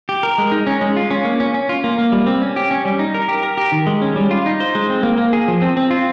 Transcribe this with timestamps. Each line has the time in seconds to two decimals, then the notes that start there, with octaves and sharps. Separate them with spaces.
0.09 G4
0.23 A#4
0.38 G#3
0.52 D#4
0.67 C#4
0.81 G#3
0.96 F4
1.11 C#4
1.25 A#3
1.40 C#4
1.54 C#4
1.69 F4
1.84 A#3
1.98 A#3
2.12 G3
2.27 C4
2.42 C#4
2.56 G4
2.71 C#4
2.85 G3
2.99 D#4
3.14 A#4
3.28 G4
3.43 A#4
3.57 G4
3.72 D#3
3.87 G#3
4.02 C#4
4.16 G3
4.31 F4
4.46 D#4
4.60 C5
4.75 G#3
4.90 C4
5.03 A#3
5.18 A#3
5.33 G#4
5.48 F3
5.62 C4
5.77 C4
5.91 F4